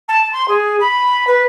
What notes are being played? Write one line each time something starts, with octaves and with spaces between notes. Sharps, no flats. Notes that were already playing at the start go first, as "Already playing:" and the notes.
A5
C6
G#4
B5
B4